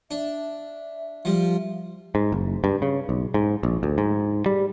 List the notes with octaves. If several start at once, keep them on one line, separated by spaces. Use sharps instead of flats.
D4 E5
F3 G3
G#2
F#1
G2
C#3
B1
G#2
A#1
D2
G#2
G3